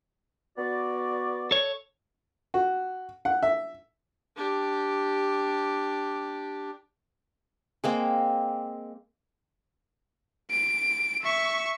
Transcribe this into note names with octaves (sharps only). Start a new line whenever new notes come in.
B3 F#4 D5
A4 C#5
F#4
F#5
E5
D4 G4
G#3 A#3 C4
D7
E5 C#6